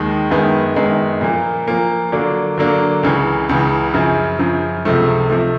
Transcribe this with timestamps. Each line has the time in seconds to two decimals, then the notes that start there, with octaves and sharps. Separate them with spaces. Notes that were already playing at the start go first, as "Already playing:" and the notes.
Already playing: D#2 D#3 G#3
0.31 F#2 D#3 G#3 B3
0.76 F#2 D#3 G#3 B3
1.21 A#2 F3 A#3
1.68 A#2 F3 A#3
2.12 D3 F#3 A#3 D4
2.57 D3 F#3 A#3 D4
3.03 C#2 C#3 E3
3.49 C#2 C#3 E3
3.94 F#2 C#3 F3
4.39 F#2 C#3 F3
4.85 C#2 C3 F3 A3
5.30 C3 F3 A3